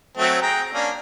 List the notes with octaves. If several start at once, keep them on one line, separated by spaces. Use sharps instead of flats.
F#3 A3 C4
G#4 G5 A#5
A#3 C#4 D4